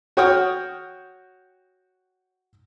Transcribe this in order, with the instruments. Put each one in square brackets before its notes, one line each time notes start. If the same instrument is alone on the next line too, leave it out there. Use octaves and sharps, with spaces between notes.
[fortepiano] F#4 C#5 F#5 G5 D#6 F6